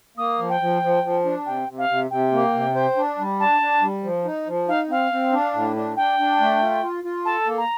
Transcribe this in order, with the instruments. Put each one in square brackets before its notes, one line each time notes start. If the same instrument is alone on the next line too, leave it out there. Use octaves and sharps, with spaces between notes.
[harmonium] A#3 [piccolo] D#6
[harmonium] F3
[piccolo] G5
[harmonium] F3
F3
F3
D4
[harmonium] C3 [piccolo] G5
[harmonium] C3
[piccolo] F5
[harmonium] C3
[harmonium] C3 [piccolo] G5
[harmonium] A#3
C3
C5
D4
G3
[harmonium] D4 [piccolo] A5
[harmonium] D4
G3
F3
D#4
F3
[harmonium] D#4 [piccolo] F5
[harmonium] C4 [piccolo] F5
[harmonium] C4
D4
A2
D4
[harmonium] D4 [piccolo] G5
[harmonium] D4
A3
F4
F4
F4
[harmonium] A4 [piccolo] A5
[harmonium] A#3
[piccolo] A#5